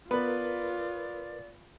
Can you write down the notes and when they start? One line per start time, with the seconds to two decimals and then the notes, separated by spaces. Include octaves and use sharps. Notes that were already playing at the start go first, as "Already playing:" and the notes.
0.11 B3 F4 A#4 B4 D5 B5